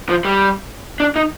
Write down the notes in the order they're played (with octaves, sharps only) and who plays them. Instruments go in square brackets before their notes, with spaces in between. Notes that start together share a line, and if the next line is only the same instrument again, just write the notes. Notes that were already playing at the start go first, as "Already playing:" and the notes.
[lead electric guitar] F3
G3
D4
D#4